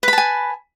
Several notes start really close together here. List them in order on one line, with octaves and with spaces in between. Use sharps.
B4 B5 A5 G#5